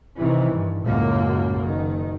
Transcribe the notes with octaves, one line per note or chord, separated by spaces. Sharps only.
C3 D#3 E3
G2
C#2 F#2 A2 A#3
F#1 D#3